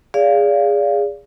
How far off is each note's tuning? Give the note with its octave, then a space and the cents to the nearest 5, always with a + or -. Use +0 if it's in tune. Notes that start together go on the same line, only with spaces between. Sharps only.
G#4 -15 D5 -30 F5 -10